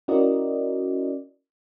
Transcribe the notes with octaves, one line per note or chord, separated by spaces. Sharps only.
C#4 E4 F#4 A#4 D5 D#5